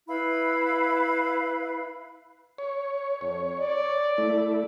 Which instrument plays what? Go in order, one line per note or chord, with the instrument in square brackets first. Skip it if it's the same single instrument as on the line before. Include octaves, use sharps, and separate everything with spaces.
[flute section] E4 B4 F5 B5
[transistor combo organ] C#5
[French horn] F2 [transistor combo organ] C#5
[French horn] D5
[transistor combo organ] A3 E4